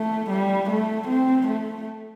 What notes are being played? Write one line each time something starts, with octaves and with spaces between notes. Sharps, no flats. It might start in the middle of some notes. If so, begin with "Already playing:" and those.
Already playing: A3
G3
A3
C4
A3